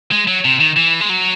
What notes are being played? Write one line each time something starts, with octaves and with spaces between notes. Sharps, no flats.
G#3
F#3
C3
D#3
E3
G#3
F#3